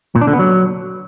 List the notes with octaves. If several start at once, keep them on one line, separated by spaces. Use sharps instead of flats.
A#2
D4
D3
B3
F#3